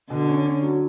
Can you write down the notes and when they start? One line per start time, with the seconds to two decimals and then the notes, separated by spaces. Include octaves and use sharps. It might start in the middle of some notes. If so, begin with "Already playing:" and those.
0.10 B2 D3
0.29 C#4
0.46 C#4
0.63 F#3